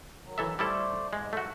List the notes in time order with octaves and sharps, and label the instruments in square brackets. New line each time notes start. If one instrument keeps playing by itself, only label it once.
[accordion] D#3 F#3
[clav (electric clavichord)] E3 A4 E5
[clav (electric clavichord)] G3 E4 A4 [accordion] A3 C5 D5
[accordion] G#2 [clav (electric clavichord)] G#3
[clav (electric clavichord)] A3 F#4